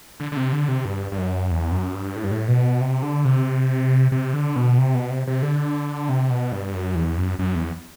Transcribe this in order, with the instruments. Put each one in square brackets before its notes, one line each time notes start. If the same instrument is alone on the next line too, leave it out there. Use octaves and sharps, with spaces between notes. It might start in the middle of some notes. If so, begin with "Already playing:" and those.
[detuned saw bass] D3
D3
C3
D3
C3
G2
G2
F#2
E2
F#2
G2
A2
G2
A2
B2
C3
D3
C3
C3
D3
B2
C3
B2
C3
C3
D3
C3
B2
G2
F#2
E2
F#2
F#2
E2